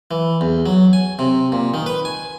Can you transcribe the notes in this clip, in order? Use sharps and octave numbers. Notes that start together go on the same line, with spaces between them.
E3
E2
F#3
G#5
C3
A#2
D#3
B4
G#5